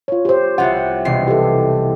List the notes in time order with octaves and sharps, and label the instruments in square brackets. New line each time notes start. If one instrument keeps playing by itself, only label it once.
[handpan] F4 C#5
G4 C5
[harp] C2 F4 [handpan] E5 F#5
[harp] E1 C3 C7
[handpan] G4 A4